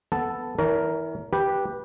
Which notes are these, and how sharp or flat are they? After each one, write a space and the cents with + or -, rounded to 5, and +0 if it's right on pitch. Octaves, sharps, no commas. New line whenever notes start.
B3 +0 A4 +0 A5 +0
E3 -25 A#4 +0 C#5 +40
G4 +0 B4 -15